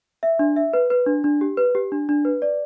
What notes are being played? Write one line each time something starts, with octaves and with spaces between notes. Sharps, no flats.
E5
D4
E5
B4
B4
D4
D4
G4
B4
G4
D4
D4
B4
D5